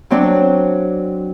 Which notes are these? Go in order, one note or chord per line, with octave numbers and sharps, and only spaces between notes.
F#3 C4 D4